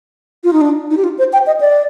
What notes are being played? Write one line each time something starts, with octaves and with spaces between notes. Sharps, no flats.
F4
D#4
D4
D#4
G4
F4
C5
G5
D#5
D5